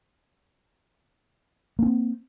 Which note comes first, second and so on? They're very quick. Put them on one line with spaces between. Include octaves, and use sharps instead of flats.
A#3 D4 C4